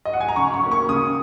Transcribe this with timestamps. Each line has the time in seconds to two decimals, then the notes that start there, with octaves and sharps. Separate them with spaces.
0.05 D#5
0.13 F#5
0.21 G#5
0.28 A#5
0.36 C#3 C#6
0.54 C#6
0.63 A#3 C#4
0.71 C#6
0.89 C#3 D#6